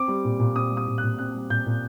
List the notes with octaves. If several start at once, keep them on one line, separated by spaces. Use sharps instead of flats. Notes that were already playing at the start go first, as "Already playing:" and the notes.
Already playing: C4 D6
G3
A#2
A#2
C4 D#6
G3
D#6
A#2
F#6
A#2
C4 F#6
G3
A#2 G6
A#2